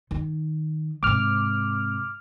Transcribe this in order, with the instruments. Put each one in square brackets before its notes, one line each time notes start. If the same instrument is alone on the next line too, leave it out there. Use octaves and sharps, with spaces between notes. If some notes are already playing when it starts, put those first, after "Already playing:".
[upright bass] D#3
[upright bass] G#2 C3 [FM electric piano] D6 F6